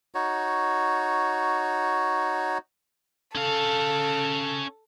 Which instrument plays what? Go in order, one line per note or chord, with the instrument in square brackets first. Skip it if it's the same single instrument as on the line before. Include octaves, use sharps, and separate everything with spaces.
[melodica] D#4 F#4 C#5
[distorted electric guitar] C#4 F5 [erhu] A4